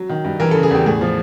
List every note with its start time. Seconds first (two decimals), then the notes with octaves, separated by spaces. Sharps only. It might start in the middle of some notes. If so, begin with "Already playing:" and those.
Already playing: F#3
0.09 D#3
0.25 G2
0.40 E3 A#4
0.51 C#3 A4
0.63 G#4
0.71 E2 G4
0.86 A2 G#4
1.01 F3